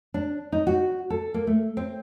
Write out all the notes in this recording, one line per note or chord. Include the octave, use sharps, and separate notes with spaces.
D4
D#4
F#4
A4
A#3
A3
C4